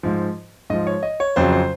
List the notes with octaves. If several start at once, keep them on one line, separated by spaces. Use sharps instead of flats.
G#2 F3
G#2 F3 D#5
C#5
D#5
C#5
F2 C#3 F#3 C5
C5